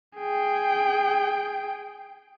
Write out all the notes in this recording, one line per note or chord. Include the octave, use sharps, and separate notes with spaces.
G#4 G5